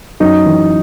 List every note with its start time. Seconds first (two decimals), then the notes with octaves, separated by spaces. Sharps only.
0.20 F#2 D#4
0.46 E3